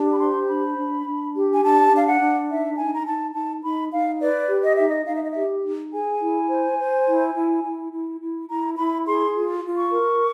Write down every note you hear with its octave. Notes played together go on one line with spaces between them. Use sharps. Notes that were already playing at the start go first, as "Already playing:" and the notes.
Already playing: D4 G4
B5
C5 C6
D4 B5
D4
D4
G4
G#5
D4 A5
D4 F5
F#5
D4
D#4 E5
D#4 G#5
A#5
D#4 A5
D#4 A5
D#4 B5
D#4 F5
B4 D5
G4
D#5
D#4 E5
D#5
D#4 F5
E5
D#5
G4 E5
D#4
G#4 G#5
E4
C5
C5
E4
E4
E4
E4
E4
E4 A#5
E4 B5
G#4 C6
F4
F4
C#6
A#4